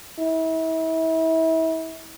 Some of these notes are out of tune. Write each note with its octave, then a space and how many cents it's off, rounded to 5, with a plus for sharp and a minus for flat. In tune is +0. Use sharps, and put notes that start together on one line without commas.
E4 -35